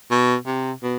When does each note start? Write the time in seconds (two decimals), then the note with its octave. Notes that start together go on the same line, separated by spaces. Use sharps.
0.11 B2
0.47 C3
0.83 B2